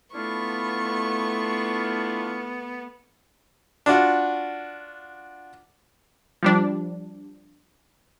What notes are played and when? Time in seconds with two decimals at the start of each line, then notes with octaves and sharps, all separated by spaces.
0.14 A3 B3 D4 E4 F4 C#6
3.86 D4 F4 F#4
6.43 F3 G3 D4